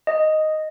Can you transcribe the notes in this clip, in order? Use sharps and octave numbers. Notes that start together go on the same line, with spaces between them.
D#5